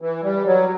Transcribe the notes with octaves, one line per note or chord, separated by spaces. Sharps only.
E3
G3
F#3